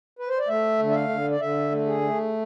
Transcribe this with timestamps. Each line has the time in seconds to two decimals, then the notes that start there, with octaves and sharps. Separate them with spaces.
0.19 B4
0.29 C5
0.39 D5
0.48 A3 E5
0.79 D3
0.90 E5
0.94 F5
1.09 D3
1.31 D5
1.40 D3 E5
1.72 A3
1.86 G#4
2.01 A3